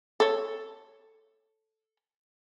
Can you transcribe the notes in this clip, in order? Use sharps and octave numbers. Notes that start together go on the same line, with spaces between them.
A4 C#5